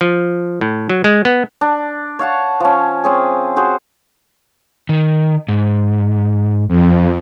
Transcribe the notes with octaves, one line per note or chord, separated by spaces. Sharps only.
F3
A2
F#3
G#3
B3
D4
C#5 F5 F#5 A5
F3 C#4
C4 C#4 G#4
F#4 G#4 C5
D#3
G#2
F2